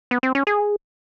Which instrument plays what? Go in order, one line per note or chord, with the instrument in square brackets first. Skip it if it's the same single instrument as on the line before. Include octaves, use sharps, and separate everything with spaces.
[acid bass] B3
C4
C#4
G#4